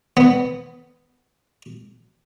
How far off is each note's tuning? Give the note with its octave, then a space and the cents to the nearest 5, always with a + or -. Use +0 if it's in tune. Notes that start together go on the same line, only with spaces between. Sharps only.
B3 +10